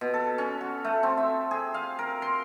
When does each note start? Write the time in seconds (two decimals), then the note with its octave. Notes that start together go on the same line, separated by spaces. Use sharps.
0.01 B2
0.14 A4
0.38 C#4
0.61 F#4
0.85 A3
1.03 C4
1.17 E5
1.51 G#4
1.74 F5
1.99 A#4
2.22 C6